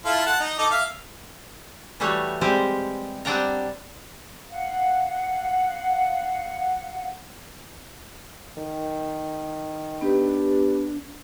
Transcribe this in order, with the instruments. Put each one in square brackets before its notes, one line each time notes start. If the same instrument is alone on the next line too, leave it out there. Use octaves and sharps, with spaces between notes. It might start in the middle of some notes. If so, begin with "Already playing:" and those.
[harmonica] E4 F4 A4
F#5 A5
D#4
D#4 A4 D6
E5 F5
[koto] E3 G3 A3 F#4 C#5
G3 G#3 C4 G4 C5
G3 C4 D4 F#5 G5 A#5
[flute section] F5 F#5
[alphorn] D#3
[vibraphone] B3 G4 B4 [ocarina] D4